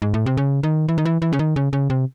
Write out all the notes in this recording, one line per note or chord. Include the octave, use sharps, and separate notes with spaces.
G#2
A2
C3
C#3
D#3
E3
D#3
E3
E3
C#3
D#3
C#3
C#3
C3